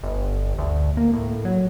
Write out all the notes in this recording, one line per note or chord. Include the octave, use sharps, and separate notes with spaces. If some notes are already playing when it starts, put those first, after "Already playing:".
G1
D2
A#3
A2
F#3